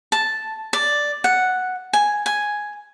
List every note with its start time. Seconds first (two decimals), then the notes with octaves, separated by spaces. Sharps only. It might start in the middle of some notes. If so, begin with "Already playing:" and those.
0.12 A5
0.73 D5
1.24 F#5
1.93 G#5
2.26 G#5